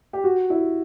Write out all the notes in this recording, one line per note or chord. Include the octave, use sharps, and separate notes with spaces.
G4
F#4
E4